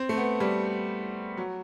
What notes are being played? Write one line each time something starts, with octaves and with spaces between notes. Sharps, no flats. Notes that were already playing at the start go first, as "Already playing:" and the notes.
Already playing: C4
A3
B3
G3
F#3